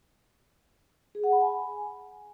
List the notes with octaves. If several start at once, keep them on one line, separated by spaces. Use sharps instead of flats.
G#4
F#5
B5
G#5